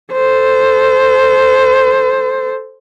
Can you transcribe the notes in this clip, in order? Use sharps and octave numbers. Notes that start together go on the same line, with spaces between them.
A4 C5